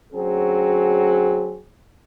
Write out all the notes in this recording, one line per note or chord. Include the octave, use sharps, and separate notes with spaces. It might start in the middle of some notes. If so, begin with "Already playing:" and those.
D2 F#3 C4 C#4 G#4